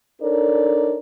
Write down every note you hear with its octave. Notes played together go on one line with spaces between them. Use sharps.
D4 D#4 A4 A#4 C#5 D5